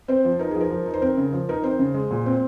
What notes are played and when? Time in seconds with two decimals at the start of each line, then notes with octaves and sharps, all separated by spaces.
0.08 C4 C5
0.25 F3
0.39 D#4 A#4
0.51 F3 G#4
0.61 A#4
0.70 F3
0.86 D#4
0.94 C5
1.02 C4 A#4
1.18 C#3
1.33 F3
1.49 D#4 A#4
1.63 C4 C5
1.79 C#3
1.94 G#3
2.11 A#2
2.26 C4